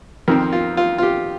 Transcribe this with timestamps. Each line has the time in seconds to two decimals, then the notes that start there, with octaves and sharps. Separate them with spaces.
0.28 F2 D#3 C4 A#4
0.52 F4
0.77 F4
0.98 F4
1.03 G4